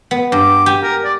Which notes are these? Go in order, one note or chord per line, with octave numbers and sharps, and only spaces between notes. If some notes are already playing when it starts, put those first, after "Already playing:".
B3
G2 D6
G4 G#5
A#4
D5